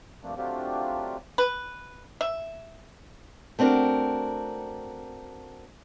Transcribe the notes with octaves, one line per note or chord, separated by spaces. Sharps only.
G2 F3 A3 A#3 C4 D4
F#3 A3 C4 D4 F4 G4
B4
E5
A3 C4 D4 F#4 A#4